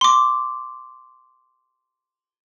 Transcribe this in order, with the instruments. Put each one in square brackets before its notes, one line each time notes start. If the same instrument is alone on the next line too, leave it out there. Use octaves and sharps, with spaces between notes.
[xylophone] C6 D6